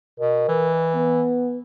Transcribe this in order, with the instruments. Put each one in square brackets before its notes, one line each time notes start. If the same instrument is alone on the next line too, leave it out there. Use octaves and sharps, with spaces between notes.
[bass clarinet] B2 [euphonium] A#4
[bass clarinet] E3
[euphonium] B3